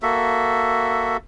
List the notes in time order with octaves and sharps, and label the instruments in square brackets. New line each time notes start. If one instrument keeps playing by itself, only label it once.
[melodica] A#3 F#4 A4 E5